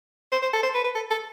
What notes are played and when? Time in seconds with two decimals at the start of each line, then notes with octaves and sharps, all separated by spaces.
0.32 C5
0.42 C5
0.53 A4
0.63 C5
0.74 B4
0.84 B4
0.95 A4
1.11 A4